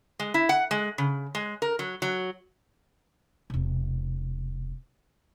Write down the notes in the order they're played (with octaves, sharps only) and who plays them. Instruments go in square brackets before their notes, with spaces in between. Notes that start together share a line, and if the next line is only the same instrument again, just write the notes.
[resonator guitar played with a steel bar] G#3
E4
F#5
G#3
C#3
G#3
A#4
F#3
F#3
[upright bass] E1 C3